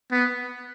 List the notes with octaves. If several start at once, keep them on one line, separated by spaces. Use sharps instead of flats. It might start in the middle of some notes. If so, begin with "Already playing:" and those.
B3